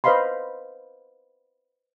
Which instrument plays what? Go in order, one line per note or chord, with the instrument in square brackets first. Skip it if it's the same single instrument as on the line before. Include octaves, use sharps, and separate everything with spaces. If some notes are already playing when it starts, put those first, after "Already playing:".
[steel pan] B4 C5 D#5 F5 B5 C6